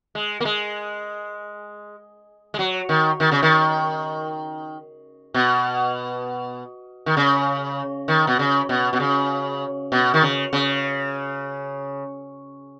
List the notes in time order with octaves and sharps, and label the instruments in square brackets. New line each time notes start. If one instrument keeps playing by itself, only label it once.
[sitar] G#3
A#3
G#3
G#3
F#3
D#3
D#3
C#3
D#3
B2
D#3
C#3
D#3
B2
C#3
B2
B2
C#3
B2
D#3
C#3
C#3